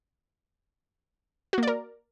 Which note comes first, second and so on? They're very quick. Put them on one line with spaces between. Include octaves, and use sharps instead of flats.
F#4 A#3 D5 A#4